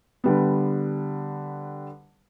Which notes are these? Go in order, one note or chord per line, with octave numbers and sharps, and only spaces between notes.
D3 G3 B3